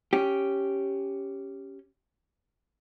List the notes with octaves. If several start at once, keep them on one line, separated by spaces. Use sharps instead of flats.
C#4 G4